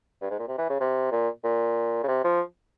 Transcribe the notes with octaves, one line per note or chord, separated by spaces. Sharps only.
G2
G#2
A#2
C3
E3
C#3
C3
A#2
A#2
C#3
C3
F3